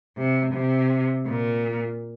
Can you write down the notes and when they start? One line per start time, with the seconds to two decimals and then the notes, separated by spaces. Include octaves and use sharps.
0.17 C3
0.53 C3
1.26 A#2